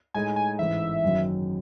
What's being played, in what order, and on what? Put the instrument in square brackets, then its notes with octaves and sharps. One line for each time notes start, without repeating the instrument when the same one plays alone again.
[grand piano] A2 G#3 D#4 [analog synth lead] G#5
[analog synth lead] G#5
[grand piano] A1 G#2 E3 [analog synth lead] E5
[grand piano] F#1 F#2 D#3 F#3